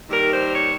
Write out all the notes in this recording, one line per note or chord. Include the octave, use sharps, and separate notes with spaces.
D#2 D#3 G3 A#4
C5
C#5